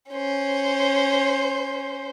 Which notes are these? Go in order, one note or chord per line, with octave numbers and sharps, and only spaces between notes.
C#4 C5